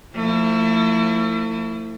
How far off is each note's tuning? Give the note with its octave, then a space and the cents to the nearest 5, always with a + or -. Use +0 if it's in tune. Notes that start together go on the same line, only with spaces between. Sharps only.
F3 +0 A3 +40 E4 +0